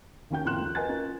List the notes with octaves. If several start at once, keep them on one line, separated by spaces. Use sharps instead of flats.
D#2 D#3 C#4 G5 G6
F2 A2 A#3 C6 F#6 E7
C#2
A#4 B4 D#5 G#5 F#6 A6
C#4 F4 A#4